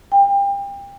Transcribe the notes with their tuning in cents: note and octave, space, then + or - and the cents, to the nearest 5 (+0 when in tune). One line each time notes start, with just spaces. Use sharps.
G5 +30